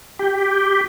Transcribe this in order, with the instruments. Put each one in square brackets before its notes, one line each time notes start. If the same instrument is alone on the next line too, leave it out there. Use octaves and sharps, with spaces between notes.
[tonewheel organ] G4